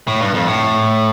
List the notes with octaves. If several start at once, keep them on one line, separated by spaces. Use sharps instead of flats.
A2
G2
F2
A2